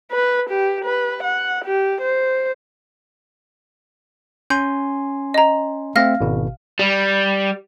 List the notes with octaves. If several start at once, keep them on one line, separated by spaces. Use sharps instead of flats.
B4
G4
B4
F#5
G4
C5
C#4 G#5 C6 G6
D#5 A#5
A3 C4 E5 F5 F6 A#6
G#1 B2
G3